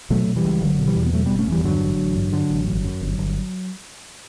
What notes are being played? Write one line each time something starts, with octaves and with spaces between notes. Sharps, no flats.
B2 F#3 A3
B2
E3 G3
C#2
F#1 D3 F#3
B2
E3 G3
E2
B3
B2 F#3 A3
F#1 G3 B3
A3 C#4
E2 E3 G3
G2 D3 F#3
A1
A1
G2
D3
A1
G1
F#2
G1
G1